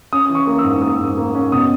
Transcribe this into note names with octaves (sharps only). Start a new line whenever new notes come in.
C#4 D#6
E3
C#6
A#3
E6
G#2
A#3 D#6
G#2
A#3
C#4
B2 D#6